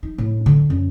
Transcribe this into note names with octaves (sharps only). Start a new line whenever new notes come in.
D#4
A2
D3
F#2